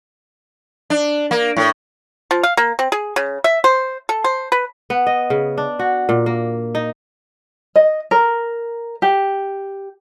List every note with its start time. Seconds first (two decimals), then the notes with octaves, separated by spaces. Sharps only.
0.90 D4
1.31 A#3
1.57 A2
2.31 F3
2.43 F5
2.57 A#3
2.79 C4
2.92 G#4
3.16 C#3
3.44 E5
3.64 C5
4.09 A4
4.24 C5
4.52 B4
4.90 B3
5.07 D#5
5.30 C#3
5.58 D4
5.79 F#4
6.09 A#2
6.26 A#3
6.75 D#4
7.76 D#5
8.11 A#4
9.02 G4